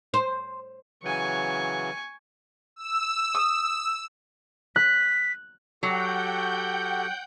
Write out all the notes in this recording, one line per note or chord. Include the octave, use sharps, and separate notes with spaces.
C5
C#3 E3 F#3 G#5 C#6
E6
D#6
F#6 B6
F#3 F#4 G4 A4 F#5 G5 G6